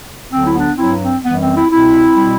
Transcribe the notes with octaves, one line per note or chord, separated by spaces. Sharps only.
D2 D3 F#3 C4
E4
B3 D4
G2 F#3 C4 E4
C4
F#2 E3 G3 B3
C4
C4 E4
C2 B2 G3 C4 E4
B2 G3